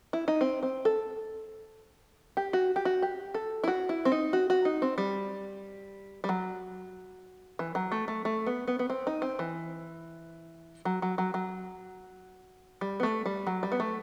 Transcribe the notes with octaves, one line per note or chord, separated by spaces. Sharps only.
E4
D#4
C4
C4
A4
G4
F#4
G4
F#4
G4
A4
E4
F#4
E4
C4
D#4
F#4
F#4
D#4
C4
G3
G3
F#3
E3
F#3
A3
A3
A3
B3
B3
B3
C4
D#4
C4
E3
F#3
F#3
F#3
F#3
G3
B3
A3
G3
F#3
G3
B3
A3